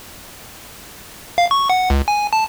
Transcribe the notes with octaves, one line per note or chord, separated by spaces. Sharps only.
F5
C#6
F#5
C#2
G#5
A5